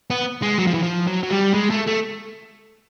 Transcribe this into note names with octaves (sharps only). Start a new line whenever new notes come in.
B3
G#3
F#3
F3
E3
F3
F#3
F#3
G3
G#3
A3
A3